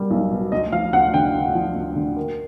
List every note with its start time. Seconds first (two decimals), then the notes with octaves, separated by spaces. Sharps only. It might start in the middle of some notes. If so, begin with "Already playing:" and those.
Already playing: B2 G3 A#3
0.11 B1
0.31 B2
0.52 D2 D#5
0.72 F3 F5
0.93 D2 F#5
1.14 D3 G5
1.35 D2
1.55 F3
1.76 D2
1.96 D3
2.16 A#3